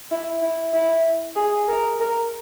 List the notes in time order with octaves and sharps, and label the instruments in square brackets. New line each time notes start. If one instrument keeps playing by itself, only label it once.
[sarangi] E4
E4
E4
G#4
A#4
A#4